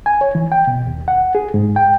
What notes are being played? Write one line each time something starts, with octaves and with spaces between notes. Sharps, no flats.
G#5
C#5
E3
G5
B2
D#2
F#5
G#4
G#2
G5